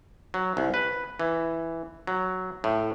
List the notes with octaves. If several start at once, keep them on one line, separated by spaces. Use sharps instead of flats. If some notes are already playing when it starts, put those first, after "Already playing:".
F#3
C2
B4
E3
F#3
A2